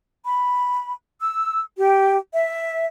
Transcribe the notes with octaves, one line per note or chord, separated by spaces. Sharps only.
B5
E6
G4
E5